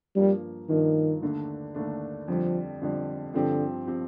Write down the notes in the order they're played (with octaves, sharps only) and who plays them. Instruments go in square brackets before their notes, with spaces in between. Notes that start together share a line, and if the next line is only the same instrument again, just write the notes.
[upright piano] G2 F3 A#3 [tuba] G3
[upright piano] G2 F3 A#3 [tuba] D#3
[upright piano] D#2 D3 A3 D4
D#2 D3 A3 D4
[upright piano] F2 D3 G3 [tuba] F3
[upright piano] F2 D3 G3
[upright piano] G2 F3 C4 G4 [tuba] D3
[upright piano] F3 C4 G4